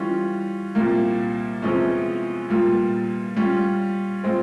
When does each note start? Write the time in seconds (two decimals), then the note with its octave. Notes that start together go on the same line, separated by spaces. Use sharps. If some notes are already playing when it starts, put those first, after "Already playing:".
Already playing: E3 G3 C#4 F4
0.75 C2 A#2 G3 A#3
1.62 E2 C3 F3 G#3 C#4
2.50 A#2 G3 A#3 F4
3.36 G3 C#4 F4
4.24 A#2 G#3 C4